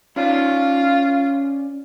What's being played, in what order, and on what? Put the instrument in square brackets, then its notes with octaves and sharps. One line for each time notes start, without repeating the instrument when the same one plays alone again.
[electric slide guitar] C#4 C#5 D5 [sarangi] F4